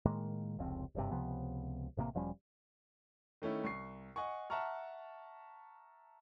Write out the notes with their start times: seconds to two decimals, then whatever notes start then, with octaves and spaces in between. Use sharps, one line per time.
0.05 A2 D#3 G#3 A#3
0.59 F1 C#2 F3 C4
0.95 F#1 G2 C3
1.11 C#2 C3 F3 B3
1.97 A1 C3 D#3 A#3
2.15 E1 F3 G3 C#4
3.42 D#3 A3 C#4 E4
3.64 C2 C#6 C7
4.16 D#5 F#5 G#5 C#6
4.50 E5 F#5 A5 A#5 C#6 F6